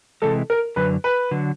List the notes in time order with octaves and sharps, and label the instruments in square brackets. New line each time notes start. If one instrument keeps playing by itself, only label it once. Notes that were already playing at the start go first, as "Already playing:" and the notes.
[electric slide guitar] C3 E3 G#3 [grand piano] A4
[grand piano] A#4
[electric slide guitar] F#2 D3 F#3 [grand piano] B4
[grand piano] B4
[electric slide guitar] D3 F#3